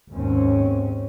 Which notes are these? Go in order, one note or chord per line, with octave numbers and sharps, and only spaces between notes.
G#1 D#2 C4 C#4